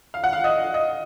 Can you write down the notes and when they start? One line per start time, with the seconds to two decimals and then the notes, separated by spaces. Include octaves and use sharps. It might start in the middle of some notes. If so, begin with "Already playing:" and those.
0.14 F5
0.24 F#5
0.33 F5
0.44 D#5
0.74 D#5